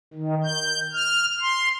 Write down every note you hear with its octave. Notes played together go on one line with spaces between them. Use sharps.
D#3
G6
F6
C6